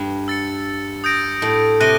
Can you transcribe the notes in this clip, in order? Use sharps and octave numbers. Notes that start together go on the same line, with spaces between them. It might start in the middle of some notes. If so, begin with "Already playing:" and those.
Already playing: G2
E6 A6 C#7
D#6 G6 A#6 D7
A2
C3 F#6 A#6 D#7 G7